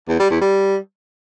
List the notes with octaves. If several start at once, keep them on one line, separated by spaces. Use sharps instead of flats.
E2
G3
E2
G3